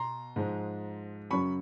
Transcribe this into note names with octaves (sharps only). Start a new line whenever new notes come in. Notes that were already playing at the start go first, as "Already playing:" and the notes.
Already playing: B2 A#5 C6
G#2 F3 G#3
F#2 C#3 F#3 B5 C#6